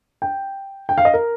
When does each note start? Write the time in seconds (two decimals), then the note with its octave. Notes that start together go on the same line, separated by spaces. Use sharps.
0.22 G5
0.89 G5
0.98 F5
1.05 D#5
1.14 A#4